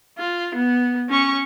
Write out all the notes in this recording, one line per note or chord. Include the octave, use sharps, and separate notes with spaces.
F4
B3
C#4 C#6